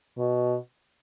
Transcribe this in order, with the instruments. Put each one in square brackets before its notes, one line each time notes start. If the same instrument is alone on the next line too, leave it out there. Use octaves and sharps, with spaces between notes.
[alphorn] B2